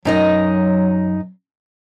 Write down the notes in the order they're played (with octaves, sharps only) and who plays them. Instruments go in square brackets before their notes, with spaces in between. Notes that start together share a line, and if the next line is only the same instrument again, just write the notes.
[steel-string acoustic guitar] F#2 D#4 D#5 [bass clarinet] F#3